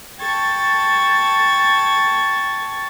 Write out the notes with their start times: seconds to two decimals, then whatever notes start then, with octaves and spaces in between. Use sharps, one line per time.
0.20 A4 G5 A5 C#6 G#6 A6